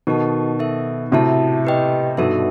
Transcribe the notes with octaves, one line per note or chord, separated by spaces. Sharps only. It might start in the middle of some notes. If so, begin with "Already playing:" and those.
B2 D#3 F#4 A4 D#5 A5
D#4 A4 E5
A2 C3 F#4 A4 E5 A5
G4 B4 D#5 G5
G2 B2 D#4 F#4 A4 E5